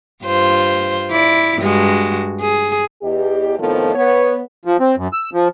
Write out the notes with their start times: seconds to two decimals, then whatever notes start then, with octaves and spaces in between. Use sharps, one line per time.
0.24 G2 F4 C5
1.11 E4 D5
1.59 G2 G#3 F#4
2.41 G#4
3.03 E2 G4 D#5
3.58 F2 A2 D#3 F3 A3 B3
3.95 B3 C#5
4.65 F3
4.80 C4
4.97 F#2
5.13 E6
5.34 F3